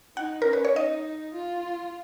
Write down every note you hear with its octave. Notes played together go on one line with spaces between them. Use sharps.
D#4 F#5
C#4 A#4
B4
C#5
D#4 D#5
F4